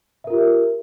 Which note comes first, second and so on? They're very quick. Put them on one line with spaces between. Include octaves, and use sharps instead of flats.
E5 A#4 F4 G4